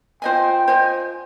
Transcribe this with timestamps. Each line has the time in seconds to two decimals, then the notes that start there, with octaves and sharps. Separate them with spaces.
0.22 F4 C5 D#5 G5 G#5
0.68 F4 C5 D#5 G#5